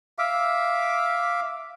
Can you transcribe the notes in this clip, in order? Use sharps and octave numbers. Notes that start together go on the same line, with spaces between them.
E5 F5 D6